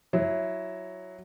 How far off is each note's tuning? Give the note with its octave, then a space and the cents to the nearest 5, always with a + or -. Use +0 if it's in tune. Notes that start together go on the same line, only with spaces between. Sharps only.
F#3 +0 E4 +0 C#5 +0